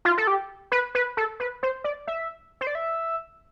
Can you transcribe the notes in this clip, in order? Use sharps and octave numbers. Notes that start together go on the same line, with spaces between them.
F4
A4
G4
B4
B4
A4
B4
C5
D5
E5
C5
D5
E5